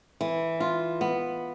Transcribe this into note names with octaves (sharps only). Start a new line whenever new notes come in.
E3
F4
B3